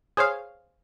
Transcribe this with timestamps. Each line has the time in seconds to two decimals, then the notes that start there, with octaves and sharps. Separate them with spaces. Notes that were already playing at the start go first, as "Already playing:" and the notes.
0.17 G#4 C5 C#5 F5